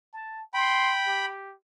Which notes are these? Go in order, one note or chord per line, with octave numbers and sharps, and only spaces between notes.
A5
G5 B5 C6
G4